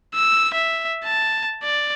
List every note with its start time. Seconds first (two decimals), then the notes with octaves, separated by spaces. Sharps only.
0.15 E6
0.54 E5
1.04 A5
1.63 D5